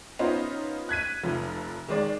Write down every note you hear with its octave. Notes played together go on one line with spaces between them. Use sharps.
B3 C#4 D#4 F4 C5
F#6 G#6 B6 D#7
F1 F3
D#3 G#3 D5